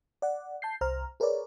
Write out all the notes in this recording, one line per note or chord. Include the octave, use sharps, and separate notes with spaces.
D5 F#5
A5 G6 C7
C2 C5 A#5 F6
G#4 A#4 B4 C#5 D5